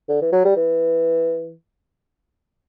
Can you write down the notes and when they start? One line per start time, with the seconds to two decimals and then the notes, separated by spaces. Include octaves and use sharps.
0.09 D3
0.22 E3
0.32 F#3
0.45 G3
0.56 E3